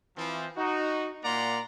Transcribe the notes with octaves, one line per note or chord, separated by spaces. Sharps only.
E3 F3 C4
D#4 F#4
A#2 A#3 D5 F#5 A#5 C6